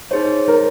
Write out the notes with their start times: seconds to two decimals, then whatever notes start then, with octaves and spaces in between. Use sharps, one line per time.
0.11 D#4 G#4 C5 C#5
0.48 A#4